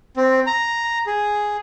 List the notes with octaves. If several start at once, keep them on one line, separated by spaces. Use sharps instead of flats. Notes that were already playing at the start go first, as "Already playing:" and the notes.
C4
A#5
G#4